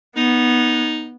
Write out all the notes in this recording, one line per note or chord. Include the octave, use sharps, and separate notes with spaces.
B3 D#4